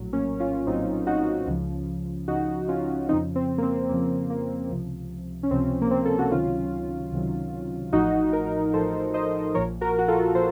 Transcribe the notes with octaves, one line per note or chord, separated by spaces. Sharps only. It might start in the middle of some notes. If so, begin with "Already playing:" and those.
Already playing: A#1 A2 F#3
A#3 C#4
C#4 F4
A#1 A2 F#3 C4 D#4
D#4 F#4
C#2 C#3 F3
C#2 C#3 F3 D#4 F#4
C#4 F4
F2 C#3 F3 C4 D#4
C4
A#3
C4
F2 C#3 F3 A#3
A#3
C#2 C3 F3
C#4
C#2 C3 F3 C4
A#3
C4
A4
F#4
C#2 C3 D#3 F#3 C#4 F4
C#2 C3 D#3 F#3
A1 A2 F3 D#4 F#4
F#4 A#4
A1 A2 F3 A4 C5
C5 D#5
A#1 A#2 F3 A#4 C#5
F#4 A#4
F#4
F4 A4
A#2 F3 A4 C5